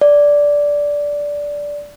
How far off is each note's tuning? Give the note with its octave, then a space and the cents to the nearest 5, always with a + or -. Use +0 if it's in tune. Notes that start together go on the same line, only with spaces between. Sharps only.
D5 -10